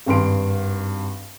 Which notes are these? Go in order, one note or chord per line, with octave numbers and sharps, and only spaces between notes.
G#1 G2 C6 D7